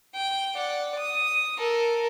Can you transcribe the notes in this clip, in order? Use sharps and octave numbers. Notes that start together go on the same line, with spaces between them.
G5
D5 F#5
D#6
A4 A#4